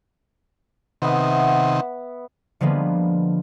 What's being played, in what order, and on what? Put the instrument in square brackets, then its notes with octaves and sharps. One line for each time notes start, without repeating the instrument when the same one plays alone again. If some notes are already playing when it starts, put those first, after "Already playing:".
[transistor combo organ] C3 D#3 [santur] B3 E5 F#5
[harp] D3 F3 G3 G#3 A#3 B3